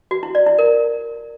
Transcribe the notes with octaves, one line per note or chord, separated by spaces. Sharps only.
F#4
E4
D5
E4
A#4